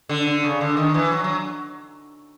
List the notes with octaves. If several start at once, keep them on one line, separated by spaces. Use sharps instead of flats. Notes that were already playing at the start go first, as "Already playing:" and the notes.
D3
D3
C#3
D3
D#3
E3
F#3
F#3